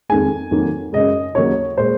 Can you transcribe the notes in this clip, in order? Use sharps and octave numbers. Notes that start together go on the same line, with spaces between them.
F2 D#3 G#3 G#5
F2 D#3 F#3 A#3
F#2 C#3 G#3 D#5
D#2 C#3 F#3 A#3 C#5
A#2 G#3 C5